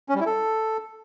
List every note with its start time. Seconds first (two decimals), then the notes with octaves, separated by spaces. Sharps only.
0.09 C#4
0.15 G3
0.21 E4
0.26 A4